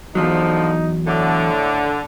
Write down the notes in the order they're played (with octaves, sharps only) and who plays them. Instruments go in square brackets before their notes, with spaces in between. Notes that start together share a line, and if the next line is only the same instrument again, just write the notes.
[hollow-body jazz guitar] E2 G#2 F#3 [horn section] D3 F3 [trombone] D#4
[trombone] A2 [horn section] D3